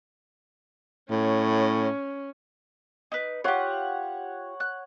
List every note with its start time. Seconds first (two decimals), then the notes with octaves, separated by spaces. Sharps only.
1.10 A2 C#4
3.12 D#4 B4
3.44 F4 G4 C#5 F#5
4.60 F#6